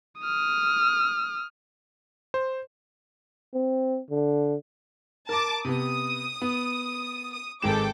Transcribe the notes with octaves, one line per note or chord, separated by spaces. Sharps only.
D#6 F6
C5
C4
D3
A#4 A5 A#5 D6
C3 B3 D#6
B3
D#6
G#1 G#3 A4 G5 D6 E7